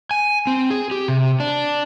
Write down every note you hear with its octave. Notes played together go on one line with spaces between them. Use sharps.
G#5
C4
G#4
G4
C3
D4